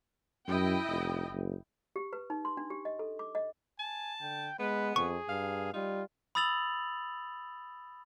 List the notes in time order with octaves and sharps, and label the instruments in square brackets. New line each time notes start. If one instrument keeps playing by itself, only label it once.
[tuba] F#2 [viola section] E4 D#5 G5
[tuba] F1
F#1
[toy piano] G4
B4
D#4
C6
D4
G4
D#5
A4
D6
D#5
[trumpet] G#5 [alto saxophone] A5
[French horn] D3 [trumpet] G5
[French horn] G#3 [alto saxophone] B3 [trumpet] B4
[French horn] F2 [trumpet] G#4 [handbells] C#6
[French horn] G2 [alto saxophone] F5
[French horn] G3 [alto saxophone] D#4 [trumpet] F4
[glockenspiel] B5 D#6 E6 A6 F7 F#7